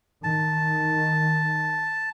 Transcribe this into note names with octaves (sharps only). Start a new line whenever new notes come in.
D#3 A5